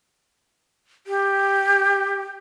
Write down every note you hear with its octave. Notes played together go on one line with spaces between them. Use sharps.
G4